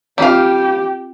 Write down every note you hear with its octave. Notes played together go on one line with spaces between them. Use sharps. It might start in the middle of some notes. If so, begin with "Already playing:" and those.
G3 C4 F4 G4 F5 G#5